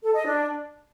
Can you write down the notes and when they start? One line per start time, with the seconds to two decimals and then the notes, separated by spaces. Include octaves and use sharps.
0.03 A4
0.14 D#5
0.25 D4